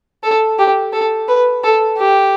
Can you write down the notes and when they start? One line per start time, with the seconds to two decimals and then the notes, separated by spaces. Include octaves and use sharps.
0.23 A4
0.59 G4
0.93 A4
1.28 B4
1.63 A4
1.98 G4